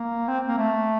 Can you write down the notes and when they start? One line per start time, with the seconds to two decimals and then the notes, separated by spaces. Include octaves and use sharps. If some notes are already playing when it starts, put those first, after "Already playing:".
Already playing: A#3
0.28 C4
0.48 A#3
0.58 A3